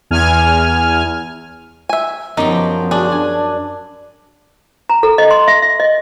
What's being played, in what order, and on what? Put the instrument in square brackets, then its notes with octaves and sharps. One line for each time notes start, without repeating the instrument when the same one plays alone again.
[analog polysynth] E2 G#5 F6
[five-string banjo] E5 G#5
[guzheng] F#2 G4 G5 [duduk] F3 [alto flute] B3 [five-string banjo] D#4
[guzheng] D4 [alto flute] F#4 [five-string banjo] G#4
[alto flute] D4 [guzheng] G#5
[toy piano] A#5
A4
D#5
C6
E5
E5
D#5